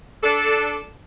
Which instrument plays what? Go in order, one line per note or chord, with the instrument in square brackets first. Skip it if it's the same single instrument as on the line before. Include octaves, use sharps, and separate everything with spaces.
[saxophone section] D4 A4